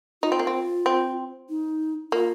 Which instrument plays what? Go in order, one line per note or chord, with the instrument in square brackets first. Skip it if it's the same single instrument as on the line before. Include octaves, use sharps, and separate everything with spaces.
[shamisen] D#4 [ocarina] F4
[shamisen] C4
A#3
C4
C4
[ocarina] D#4
[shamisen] A#3 [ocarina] F4